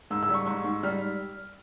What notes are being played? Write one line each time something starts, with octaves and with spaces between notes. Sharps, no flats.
G#2 E6
E6
G3 C#6
G#2 C#6
G#2
G3 F6